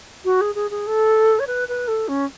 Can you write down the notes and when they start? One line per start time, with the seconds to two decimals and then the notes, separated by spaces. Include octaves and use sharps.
0.25 F#4
0.41 G#4
0.55 G#4
0.71 G#4
0.87 A4
1.39 C#5
1.47 B4
1.69 B4
1.88 A4
2.08 C#4